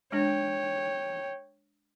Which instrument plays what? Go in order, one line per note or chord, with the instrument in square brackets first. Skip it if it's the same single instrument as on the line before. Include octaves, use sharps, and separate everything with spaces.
[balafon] G#3 D4 [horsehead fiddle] C#5 G5